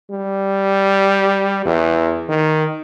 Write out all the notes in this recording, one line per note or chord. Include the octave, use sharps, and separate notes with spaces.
G3
E2
D#3